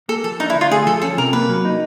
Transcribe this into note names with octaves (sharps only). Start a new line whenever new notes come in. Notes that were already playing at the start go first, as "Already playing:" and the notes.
A#3 A4
F3 A4
D4 D#4
E4
D3
F4
A3 G#4
F3 A4
C#4 A4
C3 A#4
A#3 B4
F#3
D#4